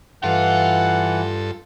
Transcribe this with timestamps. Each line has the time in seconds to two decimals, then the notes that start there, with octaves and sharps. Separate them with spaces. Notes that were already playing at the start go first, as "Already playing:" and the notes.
0.24 G2 E3 F4 A4 F#5